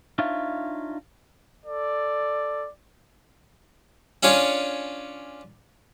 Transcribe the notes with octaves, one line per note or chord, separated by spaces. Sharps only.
D4 D#4 F4 C#5 E5 F5
A4 D5
C#4 D4 F4 C#5 G#5